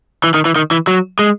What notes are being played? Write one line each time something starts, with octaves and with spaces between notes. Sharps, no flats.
E3
D#3
E3
D#3
E3
F#3
G#3